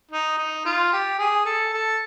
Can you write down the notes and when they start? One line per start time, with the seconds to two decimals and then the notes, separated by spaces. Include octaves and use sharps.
0.11 D#4
0.38 D#4
0.65 F4
0.92 G4
1.19 G#4
1.45 A4
1.73 A4